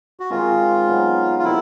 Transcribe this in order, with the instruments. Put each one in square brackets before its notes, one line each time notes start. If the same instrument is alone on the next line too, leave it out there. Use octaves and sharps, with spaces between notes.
[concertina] F#4
[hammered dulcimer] D#3 G#3 C4 [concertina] F4
[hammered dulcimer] F#3 B3 D#4
[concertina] F4
[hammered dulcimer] D#3 G3 C4 [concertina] E4